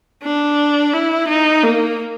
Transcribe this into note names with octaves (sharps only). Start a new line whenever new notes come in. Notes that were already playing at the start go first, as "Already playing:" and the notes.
D4
E4
D#4
A#3